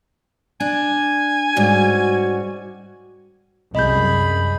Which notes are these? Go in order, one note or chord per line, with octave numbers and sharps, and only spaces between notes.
D4 G#5
G#2 G3 C#4 F#4
C2 F#2 G#4 D#5 B5 G6